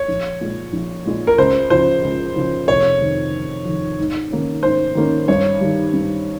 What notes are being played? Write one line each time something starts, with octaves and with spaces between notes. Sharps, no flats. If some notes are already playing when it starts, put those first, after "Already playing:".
Already playing: C#5
A#1
A#2 G#3
A#1
A#2 G#3
A#4
C#2 C5
C#3 F3 C5
C#2
C#3 F3
F1 C#5
F2 D#3
F1
F2 D#3
G#2
D#3 A#3 C#4
G#2 C5
D#3 A#3 C#4
G2 C#5
D#3 G3
G2